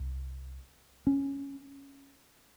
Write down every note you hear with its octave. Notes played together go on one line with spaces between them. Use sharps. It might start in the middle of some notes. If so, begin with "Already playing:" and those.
Already playing: C2
C#4